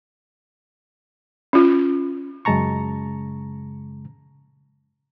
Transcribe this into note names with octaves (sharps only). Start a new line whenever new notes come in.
C#4 F4
F#2 C#3 G#3 A5 A#5 C#6